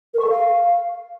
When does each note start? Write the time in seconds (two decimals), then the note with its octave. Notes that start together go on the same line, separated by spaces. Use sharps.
0.14 A#4
0.19 C#6
0.25 A4
0.30 F5